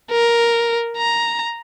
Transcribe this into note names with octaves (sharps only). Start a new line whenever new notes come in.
A#4
A#5